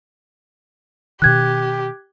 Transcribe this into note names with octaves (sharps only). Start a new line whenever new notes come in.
B2 D#3 G4 F#6 G#6